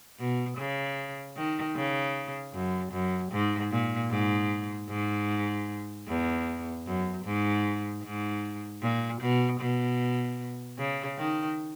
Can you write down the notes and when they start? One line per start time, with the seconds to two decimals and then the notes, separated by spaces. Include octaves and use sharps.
0.19 B2
0.57 C#3
1.36 D#3
1.76 C#3
2.53 F#2
2.92 F#2
3.32 G#2
3.71 A#2
4.10 G#2
4.89 G#2
6.08 E2
6.86 F#2
7.25 G#2
8.03 G#2
8.82 A#2
9.21 B2
9.60 B2
10.78 C#3
11.18 D#3